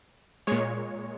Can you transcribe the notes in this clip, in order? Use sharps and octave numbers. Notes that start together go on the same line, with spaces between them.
A#2 G#3 C#5